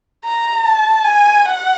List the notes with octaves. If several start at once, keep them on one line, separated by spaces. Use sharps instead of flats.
A#5
A5
G#5
F#5